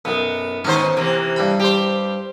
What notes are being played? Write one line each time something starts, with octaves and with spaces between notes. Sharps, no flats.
B1 F#2 B3
G#2 D#3 B3 C#4 C5
C3 E3 A#3
G2 G3 B5
G4 C5